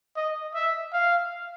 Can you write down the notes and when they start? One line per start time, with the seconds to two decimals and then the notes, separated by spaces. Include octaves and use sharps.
0.16 D#5
0.55 E5
0.93 F5